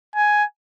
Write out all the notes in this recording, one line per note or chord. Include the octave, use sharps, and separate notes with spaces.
G#5